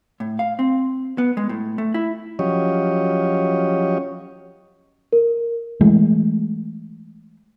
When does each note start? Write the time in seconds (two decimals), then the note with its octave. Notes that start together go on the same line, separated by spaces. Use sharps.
0.20 A2
0.39 F5
0.59 C4
1.18 B3
1.37 G#3
1.49 A2
1.78 A3
1.94 E4
2.39 F3 F#3 C#4 G4 C#5 D#5
5.13 A#4
5.81 E3 G#3 A3